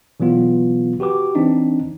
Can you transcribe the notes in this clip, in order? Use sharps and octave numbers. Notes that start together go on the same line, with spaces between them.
B2 E3 F#3 B3 F4
F#4 G4 B4 D6
E3 C4 D4 D#4